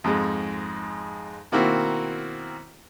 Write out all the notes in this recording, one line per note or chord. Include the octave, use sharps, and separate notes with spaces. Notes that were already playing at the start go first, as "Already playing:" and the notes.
F2 G#2 G#3
B2 D#3 A#3 C4 E4 F#4